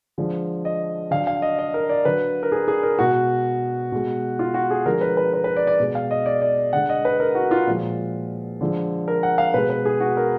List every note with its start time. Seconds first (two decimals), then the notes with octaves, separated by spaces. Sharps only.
0.18 D3 F3 G#3
0.65 D#5
1.11 D3 F#3 F5
1.27 F5
1.42 D#5
1.59 D#5
1.74 A#4
1.89 D5
2.05 D3 F#3 B4
2.43 A#4
2.52 G#4
2.68 G#4
2.83 A#4
2.98 B2 G#3 F#4
3.92 B2 G#3
4.39 F4
4.54 F#4
4.71 G#4
4.86 D3 F3 G#3 A#4
5.01 B4
5.17 B4
5.33 B4
5.44 B4
5.57 D5
5.67 D5
5.80 B2 G#3
5.95 F5
6.11 D#5
6.26 D5
6.42 D5
6.73 D3 G#3 F#5
6.89 D#5
7.05 B4
7.20 A#4
7.35 F#4
7.51 F4
7.67 A#2 F3 G#3
8.61 D3 F3 G#3
9.08 A#4
9.23 F#5
9.38 F5
9.54 B2 G#3 B4
9.70 B4
9.86 G#4
10.00 F#4
10.17 A#4